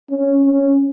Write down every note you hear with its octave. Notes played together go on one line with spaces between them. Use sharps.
C#4
C#4